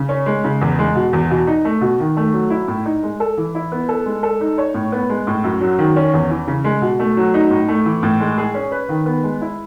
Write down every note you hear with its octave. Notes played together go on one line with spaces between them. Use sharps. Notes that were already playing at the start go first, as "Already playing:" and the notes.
Already playing: C#3
C#4
G#3
C#3
E2
G#3
B2
E2
B2
D#4
A3
B2
D#3
A3
F#3
E4
A2
D#4
G#3
A4
E3
E4
B3
A4
G#3
A4
D#4
C#5
A2
B3
G#3
A2
F#2
F#3
D#3
C#4
E2
E3
C#3
G#3
B2
A3
F#3
D#4
A2
A3
E3
A2
G#3
G#4
C#4
B4
D#3
B3
G#3
E4